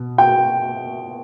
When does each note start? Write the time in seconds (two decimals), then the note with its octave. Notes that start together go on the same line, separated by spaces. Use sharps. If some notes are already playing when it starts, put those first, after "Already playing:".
Already playing: B2
0.18 G5